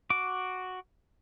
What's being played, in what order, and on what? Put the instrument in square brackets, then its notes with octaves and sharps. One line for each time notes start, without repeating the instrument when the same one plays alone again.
[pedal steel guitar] F#4 D6